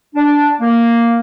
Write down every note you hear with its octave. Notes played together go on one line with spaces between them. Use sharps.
D4
A#3